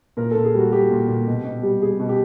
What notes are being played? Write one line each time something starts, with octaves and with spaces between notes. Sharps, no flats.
A#2 A#4
A#2 A4
G#4
G3 F#4
G3 G4
A#2
A#2
B2
B2
G3
G3 G#4
B2
G4